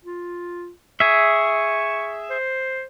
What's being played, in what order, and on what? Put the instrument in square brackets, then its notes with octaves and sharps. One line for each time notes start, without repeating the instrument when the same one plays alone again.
[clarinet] F4
[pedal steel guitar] G#4 E5 [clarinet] C#6
[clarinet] C5